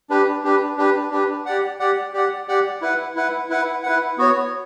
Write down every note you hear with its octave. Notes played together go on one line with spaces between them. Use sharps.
D4 G4 B4
D4 G4 B4
D4 G4 B4
D4 G4 B4
G4 D5 F#5
G4 D5 F#5
G4 D5 F#5
G4 D5 F#5
E4 B4 F#5
E4 B4 F#5
E4 B4 F#5
E4 B4 F#5
B3 F#4 C#5